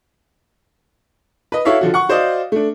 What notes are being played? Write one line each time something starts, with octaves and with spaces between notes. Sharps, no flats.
B4 D#5
E4 F#4 A4 C#5 E5 F5
D3 F3 F#4
F#5 C#6
F#4 C5 D5 D#5 F5
A3 D4